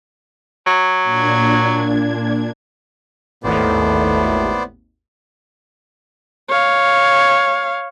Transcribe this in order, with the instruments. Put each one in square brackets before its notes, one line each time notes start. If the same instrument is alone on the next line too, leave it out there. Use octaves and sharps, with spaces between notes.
[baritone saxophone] F#3
[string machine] A#2 D4 G#6
[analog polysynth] G#1 D#2 [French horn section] A2 A3 [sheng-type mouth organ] B3 C5 D5
[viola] C#5 F5